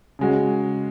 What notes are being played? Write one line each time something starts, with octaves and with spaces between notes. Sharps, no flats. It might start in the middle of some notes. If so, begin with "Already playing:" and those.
C#3 G#3 F#4